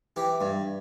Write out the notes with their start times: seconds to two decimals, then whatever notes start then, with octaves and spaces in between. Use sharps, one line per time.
0.16 E3 G4
0.41 G2